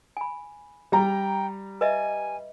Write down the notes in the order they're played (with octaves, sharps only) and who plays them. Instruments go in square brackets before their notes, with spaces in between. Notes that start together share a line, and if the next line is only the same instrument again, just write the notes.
[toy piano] G#5 B5
[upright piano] G3 A#5 [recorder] G5
[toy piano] B4 D#5 E5 [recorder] G#5